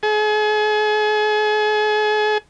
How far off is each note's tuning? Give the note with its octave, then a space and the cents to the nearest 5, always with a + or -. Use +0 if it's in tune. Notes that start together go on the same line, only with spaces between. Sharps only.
G#4 +40